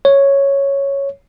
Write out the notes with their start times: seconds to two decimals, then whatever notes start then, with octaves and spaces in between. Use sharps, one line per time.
0.05 C#5